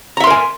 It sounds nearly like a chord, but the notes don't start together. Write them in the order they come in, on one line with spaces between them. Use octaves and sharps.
A#5 E5 C6 A#4 G#5